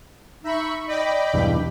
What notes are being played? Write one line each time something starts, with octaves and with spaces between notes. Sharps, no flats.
D#4 E5 B5 C#6
D5 D#5 G5 B5
B1 E2 G2